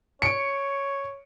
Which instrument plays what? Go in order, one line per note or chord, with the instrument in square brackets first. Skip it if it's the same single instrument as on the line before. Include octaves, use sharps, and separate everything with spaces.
[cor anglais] C#5 [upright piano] C#7 D7